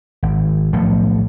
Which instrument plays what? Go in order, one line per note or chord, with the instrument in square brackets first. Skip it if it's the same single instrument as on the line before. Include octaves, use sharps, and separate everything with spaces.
[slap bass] G#1
B1 A2 F3 A3